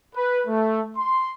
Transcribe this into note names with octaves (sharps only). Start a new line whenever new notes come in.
B4
A3
C6